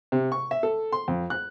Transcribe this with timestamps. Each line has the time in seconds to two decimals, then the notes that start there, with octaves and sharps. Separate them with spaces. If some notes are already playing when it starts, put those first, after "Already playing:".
0.12 C3
0.32 C#6
0.51 E5
0.63 A4
0.92 C6
1.08 F2
1.30 F#6